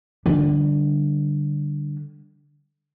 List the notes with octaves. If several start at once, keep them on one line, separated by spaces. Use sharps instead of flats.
D3 G3